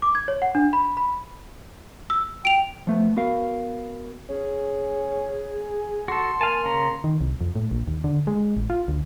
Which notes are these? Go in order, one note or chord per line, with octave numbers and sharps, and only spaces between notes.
D6
G#6
C#5
F#5
D4
B5
B5
E6
G5 D7 F7
F3 A3 B3
B3 F#4 A#4 F5
C#4 G#4
F#4 A4 C6
A#3 F5 G#5 A5
C#3 C#4 A#5
D#3
C2
F2
A2
A#1
D#2
D3
G#3
A1
F4
D2